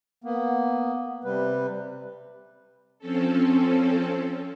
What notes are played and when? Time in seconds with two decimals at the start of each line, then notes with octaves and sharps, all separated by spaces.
0.24 A#3 B3
1.24 C3 G3 B4
2.98 F3 C4 C#4 A4